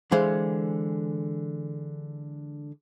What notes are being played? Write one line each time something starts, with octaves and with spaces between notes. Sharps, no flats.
D3 E3 G#3 C5 F5